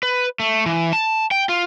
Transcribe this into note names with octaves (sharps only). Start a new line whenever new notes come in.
B4
A3
E3
A5
G5
F4